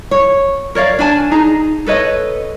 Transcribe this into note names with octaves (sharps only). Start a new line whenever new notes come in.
C#5
A#4 C#5 D5 F5
D4 D5 G#5 A5
D#4 G#4 A#5
A4 B4 C#5 D#5